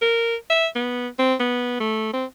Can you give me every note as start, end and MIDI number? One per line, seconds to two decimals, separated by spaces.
0.01 0.36 70
0.50 0.67 76
0.75 1.08 59
1.19 1.35 60
1.40 1.78 59
1.80 2.13 57
2.13 2.25 60